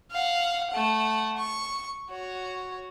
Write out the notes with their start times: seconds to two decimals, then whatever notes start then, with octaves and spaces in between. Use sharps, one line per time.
0.11 F5 F#5
0.71 A3 F#5
1.37 C#6
2.10 F#4 C#5